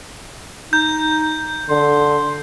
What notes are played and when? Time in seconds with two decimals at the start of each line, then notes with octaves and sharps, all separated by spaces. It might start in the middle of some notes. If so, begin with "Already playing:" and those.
0.73 D#4 G6
1.70 D3 C6